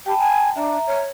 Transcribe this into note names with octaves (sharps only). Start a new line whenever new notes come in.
G4 G5 A5 B5
G#5
D4 E5 A#5
C#5